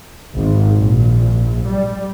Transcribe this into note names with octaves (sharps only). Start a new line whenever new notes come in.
G#1
A#1
G3